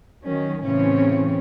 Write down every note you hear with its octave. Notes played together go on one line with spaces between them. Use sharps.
D#3 F#3 C#4
A2 C#3 E3 C4 C#4 C#5